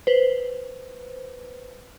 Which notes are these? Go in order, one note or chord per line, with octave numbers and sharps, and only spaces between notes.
B4 C5